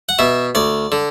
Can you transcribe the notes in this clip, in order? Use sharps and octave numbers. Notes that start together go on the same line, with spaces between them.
F#5
B2 E5
D2 D5
D3